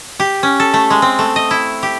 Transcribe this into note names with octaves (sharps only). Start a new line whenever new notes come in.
G4
C#4
A4
A3
G#3
C4
A3
D#5
E4
G4